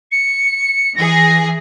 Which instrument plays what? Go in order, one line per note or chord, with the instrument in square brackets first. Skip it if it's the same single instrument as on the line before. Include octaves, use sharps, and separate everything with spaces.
[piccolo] C#7
[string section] E3 G#4 [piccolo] A#6